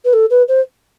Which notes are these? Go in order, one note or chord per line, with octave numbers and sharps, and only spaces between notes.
B4
A4
B4
C5